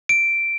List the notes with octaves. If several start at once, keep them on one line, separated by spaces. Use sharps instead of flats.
D7